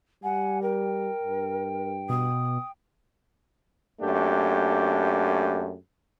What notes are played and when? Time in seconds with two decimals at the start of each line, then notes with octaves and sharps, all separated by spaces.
0.23 G3 F#5 G#5
0.62 A#4 G5
1.23 G2
2.09 B2 D#6
4.01 F#2 A3 A#3 D4 G4